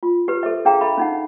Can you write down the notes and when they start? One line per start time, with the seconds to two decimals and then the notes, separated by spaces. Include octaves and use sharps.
0.03 F4
0.28 G4 B4
0.43 A4 C5 E5
0.65 D4 G#4 F5 G5 A#5
0.81 A4 E5 F5 B5
0.98 C#4 D#4 F#5